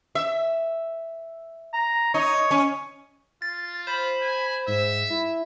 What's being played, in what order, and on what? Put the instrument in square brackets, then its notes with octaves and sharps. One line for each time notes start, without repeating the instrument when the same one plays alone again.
[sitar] E5
[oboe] A#5
[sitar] D#4 [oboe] C#5
[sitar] C#4
[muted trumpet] F4 [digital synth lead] A6
[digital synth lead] C5 [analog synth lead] B5
[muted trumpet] G#5
[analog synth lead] G#2 [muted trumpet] E5
[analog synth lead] E4